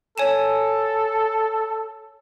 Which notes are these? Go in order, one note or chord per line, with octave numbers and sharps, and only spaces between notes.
A4 C#5 G#5 E7